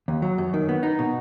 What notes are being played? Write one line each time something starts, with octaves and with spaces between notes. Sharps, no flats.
D#2
F#3
F#2
D#3
B3
D#4
B2